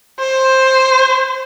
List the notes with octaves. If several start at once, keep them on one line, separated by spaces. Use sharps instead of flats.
C5